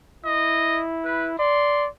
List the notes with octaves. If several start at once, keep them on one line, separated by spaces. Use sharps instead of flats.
E4 D#5
B4
D5 C6